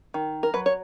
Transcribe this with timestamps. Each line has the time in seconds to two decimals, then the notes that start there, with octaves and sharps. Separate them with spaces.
0.14 D#3
0.43 A#4
0.54 F#3 B4
0.66 C#5